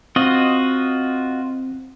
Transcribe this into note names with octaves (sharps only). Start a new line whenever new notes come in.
C4 F4 F#4 D#5